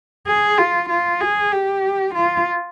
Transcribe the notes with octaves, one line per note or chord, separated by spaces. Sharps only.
G#4
F4
F4
G#4
G4
F4